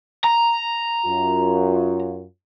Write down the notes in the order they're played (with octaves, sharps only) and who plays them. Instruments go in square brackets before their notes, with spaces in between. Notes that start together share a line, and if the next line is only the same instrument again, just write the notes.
[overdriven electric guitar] A#5
[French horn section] F#2 F4